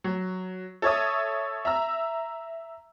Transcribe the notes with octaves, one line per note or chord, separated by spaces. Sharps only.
F#3
A4 C#5 E5 D#6
E5 A#5 E6